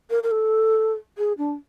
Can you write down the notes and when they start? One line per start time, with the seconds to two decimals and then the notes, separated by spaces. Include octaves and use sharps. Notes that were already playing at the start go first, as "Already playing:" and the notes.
0.10 A#4
0.23 A#4
0.31 A4
1.18 G#4
1.38 D4